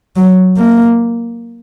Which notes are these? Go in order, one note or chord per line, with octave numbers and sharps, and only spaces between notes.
F#3
A#3